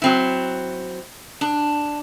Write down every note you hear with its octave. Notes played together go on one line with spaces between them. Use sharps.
F#3 C4 E4
D4